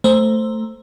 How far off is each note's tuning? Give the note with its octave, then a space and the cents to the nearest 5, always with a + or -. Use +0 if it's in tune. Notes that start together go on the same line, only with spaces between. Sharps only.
A3 +5 C5 +0 A#5 +0